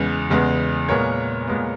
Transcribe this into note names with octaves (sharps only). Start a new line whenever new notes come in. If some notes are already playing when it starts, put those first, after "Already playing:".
Already playing: E2 C#3 G#3 B3
E2 C#3 G#3 B3
A#2 G#3 B3 A#4 C#5
A#2 G#3 B3